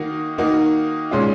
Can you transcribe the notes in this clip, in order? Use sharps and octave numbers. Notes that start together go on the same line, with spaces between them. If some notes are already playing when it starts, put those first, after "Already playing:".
Already playing: D#3 A#3 D#4 F#4
D#3 A#3 D#4 F#4
A#2 G#3 C#4 F4